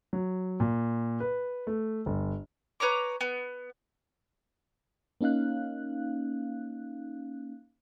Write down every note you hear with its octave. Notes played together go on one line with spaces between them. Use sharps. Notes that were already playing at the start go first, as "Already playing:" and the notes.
F#3
A#2
B4
A3
G1
B4 C#5 A#5 D6
B3
A#3 C#4 D#4 F5 F#6